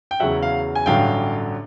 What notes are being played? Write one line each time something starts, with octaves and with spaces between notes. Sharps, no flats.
G5
E2 C#3 F#3 E5 F#5
F5
G#5
A1 G2 D3 F#3 F5 G5